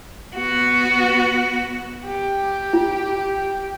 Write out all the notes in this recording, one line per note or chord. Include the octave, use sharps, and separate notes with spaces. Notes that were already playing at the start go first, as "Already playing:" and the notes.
B3 F#4
G4
F4